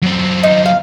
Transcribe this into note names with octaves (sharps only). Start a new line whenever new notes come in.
F#2 C4
D#4
F5